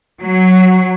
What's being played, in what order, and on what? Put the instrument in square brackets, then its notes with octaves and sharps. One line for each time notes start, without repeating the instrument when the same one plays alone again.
[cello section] F#3